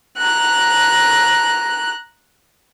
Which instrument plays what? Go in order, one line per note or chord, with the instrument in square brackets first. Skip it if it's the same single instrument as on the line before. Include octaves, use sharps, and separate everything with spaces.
[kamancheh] A#5 F#6